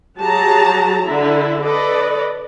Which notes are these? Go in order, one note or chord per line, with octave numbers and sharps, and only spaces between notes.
F#3 G4 G#4 A5 A#5
D3 E4
A4 B4 D5 D#5